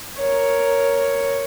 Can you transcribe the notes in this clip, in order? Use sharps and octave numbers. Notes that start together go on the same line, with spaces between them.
A#4 C#5